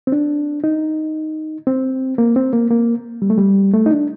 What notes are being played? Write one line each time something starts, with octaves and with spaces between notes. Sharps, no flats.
C4
D4
D#4
C4
A#3
C4
A#3
A#3
G3
A3
G3
A3
D#4
D4